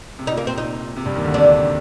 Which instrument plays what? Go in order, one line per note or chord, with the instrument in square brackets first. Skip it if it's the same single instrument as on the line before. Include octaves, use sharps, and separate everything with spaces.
[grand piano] C3
[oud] D#4
[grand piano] A#2
[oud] A#3
[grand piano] C3 [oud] C4
[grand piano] A#2 [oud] D#4
[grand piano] C3
G2 G3
D#2 D#3
D2 D3
[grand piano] C3 [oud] D4